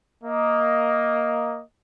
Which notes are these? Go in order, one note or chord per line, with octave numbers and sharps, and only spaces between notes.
A#3 D#5